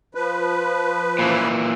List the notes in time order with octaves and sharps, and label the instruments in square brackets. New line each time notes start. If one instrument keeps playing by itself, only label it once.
[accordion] F3 B4
[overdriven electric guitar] A#2 E3